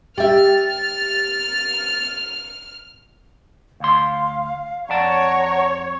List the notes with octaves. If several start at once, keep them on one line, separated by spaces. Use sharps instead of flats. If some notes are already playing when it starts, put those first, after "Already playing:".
G4 E5 F6 A6
D2 F5 C6
F2 C#5 D5 F#5 A5 A#5